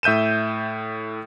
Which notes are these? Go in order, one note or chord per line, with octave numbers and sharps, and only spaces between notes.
A2 E5 G6 D#7 E7